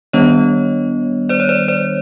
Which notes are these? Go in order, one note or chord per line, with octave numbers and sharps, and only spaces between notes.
D#3 G3 B3 D4 C#5 D#5
C5 D5
C#5
C5 D5
C5 D5